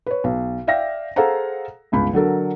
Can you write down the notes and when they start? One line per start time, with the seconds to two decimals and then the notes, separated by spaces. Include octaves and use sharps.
0.06 B4 C#5
0.24 B1
0.67 D5 E5 F5 G5 A#6
1.16 G#4 A4 C5 F5 F#5 A#5
1.92 G1 C#2 B5
2.13 D3 F#3 A4 A#4